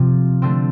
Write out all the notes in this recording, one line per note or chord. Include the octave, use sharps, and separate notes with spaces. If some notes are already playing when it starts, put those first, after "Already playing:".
Already playing: C3 F3 C4 F4
D3 A3 C4